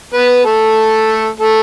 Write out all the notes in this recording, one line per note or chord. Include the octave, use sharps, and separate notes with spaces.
B3 B4
A3 A4
A3 A4